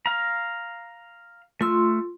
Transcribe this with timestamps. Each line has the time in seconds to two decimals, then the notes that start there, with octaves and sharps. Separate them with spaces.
0.06 F5 A#5
1.61 A3 F4 C6 E6